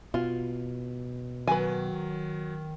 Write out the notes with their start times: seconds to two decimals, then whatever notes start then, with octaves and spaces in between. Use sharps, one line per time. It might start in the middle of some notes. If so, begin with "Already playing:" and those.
0.14 B2 F4
1.47 D#3 F#3 B4 G#5